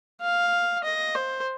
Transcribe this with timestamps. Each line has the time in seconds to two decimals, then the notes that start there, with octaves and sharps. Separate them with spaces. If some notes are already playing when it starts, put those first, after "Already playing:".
0.21 F5
0.84 D#5
1.15 C5